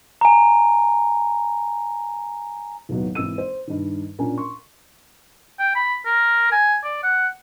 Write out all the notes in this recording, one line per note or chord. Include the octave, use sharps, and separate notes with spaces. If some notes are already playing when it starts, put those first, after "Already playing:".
G#5 A#5
D#2 A2 F#3 B3
G#1 E3 A#3 E6 D#7
C5
G2 D#3
A#2 C#4 D4 A#4 G#5
C6 C#6
G5
B5
A#4
G#5
D5
F#5